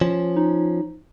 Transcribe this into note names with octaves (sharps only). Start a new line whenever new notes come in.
F3 C#4
D#4